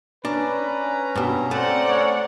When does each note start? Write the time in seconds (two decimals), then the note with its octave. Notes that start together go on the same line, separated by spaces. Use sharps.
0.25 C#4 D4 B4 A#5
1.16 G2 B2
1.51 A3 C4 D5 F#5
1.89 C#5